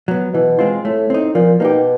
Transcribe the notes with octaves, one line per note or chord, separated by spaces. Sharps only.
F#3 B3
B2 E3
G#3 C4 F4
A2 A3
C4 D#4
A#2 F3
B2 A#3 D#4 G4